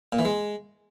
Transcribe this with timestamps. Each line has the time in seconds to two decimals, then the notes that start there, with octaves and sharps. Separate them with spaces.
0.12 A#2
0.19 E3
0.25 G#3